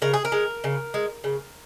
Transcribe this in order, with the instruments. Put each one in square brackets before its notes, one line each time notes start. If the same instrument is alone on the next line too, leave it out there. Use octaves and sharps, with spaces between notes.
[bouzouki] C#3 A#4
G#4
A#4
G#3
C#3
G#3
C#3